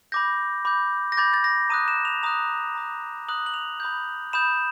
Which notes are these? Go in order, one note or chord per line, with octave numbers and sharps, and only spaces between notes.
B5 D6 G6 A#6
B5 D6 G6
A#6
B5 D6 G6 A6
A6
A#6
A#5 D#6 F#6 D#7
E7
F7
A#5 D#6 F#6 F7
A#5 D#6 F#6
A#5 D#6 F#6 F#7
F#7
F7
B5 D#6 G6
B5 D#6 G6 E7